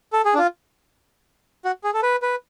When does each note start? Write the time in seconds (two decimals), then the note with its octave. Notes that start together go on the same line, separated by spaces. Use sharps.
0.13 A4
0.25 G#4
0.34 D4
0.38 F4
1.65 F#4
1.84 G#4
1.94 A4
2.03 B4
2.22 B4